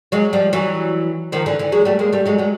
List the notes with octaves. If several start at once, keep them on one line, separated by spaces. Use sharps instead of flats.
F#3 G#3
F3 G3
E3 F#3
D#3 F3
D3 E3
D3 E3
F#3 G#3
G3 A3
G#3 A#3
G3 A3
F#3 G#3
F#3 G#3